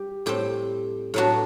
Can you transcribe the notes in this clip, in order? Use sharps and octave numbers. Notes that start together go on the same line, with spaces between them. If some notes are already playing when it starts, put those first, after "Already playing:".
Already playing: G3 G4
A2 G3 C4 G4
A2 F#3 B3 D4 F#4